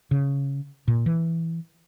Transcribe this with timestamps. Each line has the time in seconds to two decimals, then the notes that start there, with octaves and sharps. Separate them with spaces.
0.11 C#3
0.88 A#2
1.06 E3